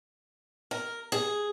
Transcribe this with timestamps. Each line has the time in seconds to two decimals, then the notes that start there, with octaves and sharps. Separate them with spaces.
0.71 A#4
1.12 G#4